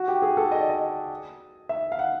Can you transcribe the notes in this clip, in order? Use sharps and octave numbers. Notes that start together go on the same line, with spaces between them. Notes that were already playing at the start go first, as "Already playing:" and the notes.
Already playing: F#4
G4
G#4
A4
D#5
D5
D#5
E5
F5
F#5